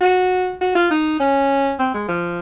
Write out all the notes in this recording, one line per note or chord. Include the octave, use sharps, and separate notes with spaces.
F#4
F#4
F4
D#4
C#4
C4
G#3
F3